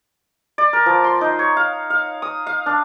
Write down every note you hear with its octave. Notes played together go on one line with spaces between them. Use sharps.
D5
A#4
F3
C6
D#4
C#5
F5
F5
D#6
F5
D4